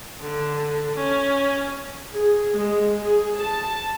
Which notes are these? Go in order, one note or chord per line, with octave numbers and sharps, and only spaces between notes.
D3
C#4
G#4
G#3
G#4
A5